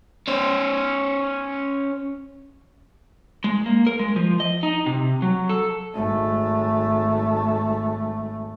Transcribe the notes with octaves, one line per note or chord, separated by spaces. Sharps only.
C#4 C5
G#3
A#3
A#4
G#3
F3
D#5
D#4
C3
F#3
A4
G#1 A3